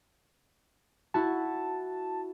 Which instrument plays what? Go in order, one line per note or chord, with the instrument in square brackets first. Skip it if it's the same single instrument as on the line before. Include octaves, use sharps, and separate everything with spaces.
[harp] E4 F#4 [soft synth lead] A5